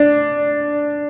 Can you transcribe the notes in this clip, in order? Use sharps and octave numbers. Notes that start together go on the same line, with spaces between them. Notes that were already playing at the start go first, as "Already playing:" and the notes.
Already playing: D4